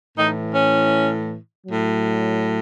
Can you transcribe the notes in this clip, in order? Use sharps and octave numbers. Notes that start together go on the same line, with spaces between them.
A2 E3 D#4
C#4
A2 F#3